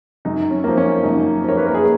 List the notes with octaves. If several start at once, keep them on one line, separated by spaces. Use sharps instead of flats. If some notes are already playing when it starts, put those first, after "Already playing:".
F#2 D#4
C#4
F3 A#3
C#4
F#2 D#4
F3 A#3 C#5
B4
A#4
G#4